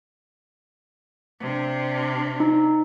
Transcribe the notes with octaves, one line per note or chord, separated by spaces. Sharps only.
C3 D4
D#4